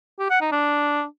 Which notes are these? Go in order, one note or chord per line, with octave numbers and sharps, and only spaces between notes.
G4
F#5
D#4
D4